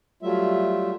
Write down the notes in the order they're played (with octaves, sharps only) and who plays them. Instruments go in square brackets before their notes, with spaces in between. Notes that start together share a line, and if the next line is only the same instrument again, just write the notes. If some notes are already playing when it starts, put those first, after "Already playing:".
[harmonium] F#3 G3 A3 F4 E5